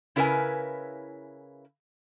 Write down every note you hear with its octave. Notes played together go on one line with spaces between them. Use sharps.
C#3 E4 A#4 B4 D#5 G#5